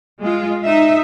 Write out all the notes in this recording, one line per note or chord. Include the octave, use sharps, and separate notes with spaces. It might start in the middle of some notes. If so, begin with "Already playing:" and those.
G#3 F4
D#4 E5